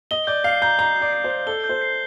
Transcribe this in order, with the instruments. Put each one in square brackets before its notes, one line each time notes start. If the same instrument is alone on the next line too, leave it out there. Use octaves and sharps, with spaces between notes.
[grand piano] D#5 [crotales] G7
[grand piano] D5 [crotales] G6
[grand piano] F5 [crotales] C7
[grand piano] A#5 [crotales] G6
[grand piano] A#5 [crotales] G7
[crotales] G6
[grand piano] D5
[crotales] C7
[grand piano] C5
[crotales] G6
[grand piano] A4 [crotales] G7
[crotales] G6
[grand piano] C5
[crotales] C7